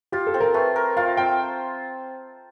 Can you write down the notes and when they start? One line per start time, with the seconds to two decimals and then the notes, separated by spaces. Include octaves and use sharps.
0.12 F4 G4
0.27 A4
0.34 C4
0.40 A#4
0.54 A3 B4
0.76 A#4
0.97 F4 F5
1.17 C4 G5